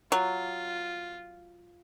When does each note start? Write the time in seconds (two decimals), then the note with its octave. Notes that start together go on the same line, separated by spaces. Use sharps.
0.12 F#3 F4